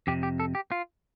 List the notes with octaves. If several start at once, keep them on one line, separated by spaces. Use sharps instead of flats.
F2 C3 G4
G4
A4
G4
F4